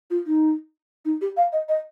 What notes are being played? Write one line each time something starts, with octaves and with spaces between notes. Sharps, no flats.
F4
D#4
D#4
G4
F5
D#5
D#5